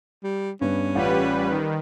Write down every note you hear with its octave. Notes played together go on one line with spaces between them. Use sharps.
G3
G2 B3 C#4
A1 G3 F4 B4 F#5
D#3